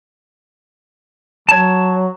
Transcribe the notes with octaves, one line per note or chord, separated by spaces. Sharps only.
F#3 C#5 A5